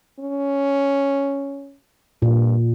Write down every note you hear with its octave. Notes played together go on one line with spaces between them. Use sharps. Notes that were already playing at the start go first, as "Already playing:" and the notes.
C#4
G2 A#2